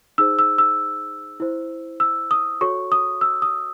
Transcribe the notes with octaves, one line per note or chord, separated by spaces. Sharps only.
D#4 G#4 C5 E6
E6
E6
E4 C5
E6
D#6
F#4 A4 C#5 C#6
D#6
E6
D#6